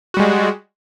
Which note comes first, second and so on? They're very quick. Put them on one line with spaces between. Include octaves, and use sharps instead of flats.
F#4 G3 G#3